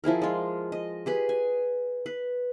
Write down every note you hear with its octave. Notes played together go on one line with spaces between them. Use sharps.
F3 E4 G#4 A#4
G#3 F4
D#5
G4 G#4 B4
G#5
B4